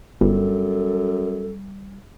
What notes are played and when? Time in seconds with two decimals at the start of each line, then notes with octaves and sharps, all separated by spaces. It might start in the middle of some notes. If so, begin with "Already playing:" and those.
0.21 G1 F#2 G3 A4